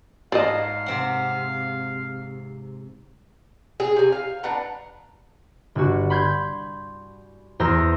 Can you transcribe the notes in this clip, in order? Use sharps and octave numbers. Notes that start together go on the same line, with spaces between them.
G#2 D5 D#5 F5 A5 A#5
C3 C4 F#5
G#4
C3 G#5
F5
D4 B4 F#5 A#5
G1 F#4
B5 C6 G6 G#6
E2 C5 A#5 E6 A#6